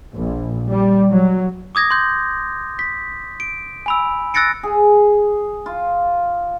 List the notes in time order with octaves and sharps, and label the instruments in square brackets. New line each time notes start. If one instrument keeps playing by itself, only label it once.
[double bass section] A#1
G3
F#3
[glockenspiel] D6 D#6 G#6 A#6
C6 G6
B6
D7
G#5 B5 E6
E6 F#6 A6 A#6 C#7 D7
[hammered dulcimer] G#4
F4